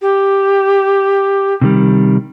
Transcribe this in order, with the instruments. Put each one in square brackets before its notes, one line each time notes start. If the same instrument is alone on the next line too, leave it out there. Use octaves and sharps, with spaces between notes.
[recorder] G4
[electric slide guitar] C3 D#3 G3